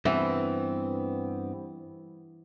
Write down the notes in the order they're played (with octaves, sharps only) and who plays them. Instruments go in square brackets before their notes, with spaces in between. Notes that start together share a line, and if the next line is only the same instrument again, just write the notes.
[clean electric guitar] G2 B3 C4 [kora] E3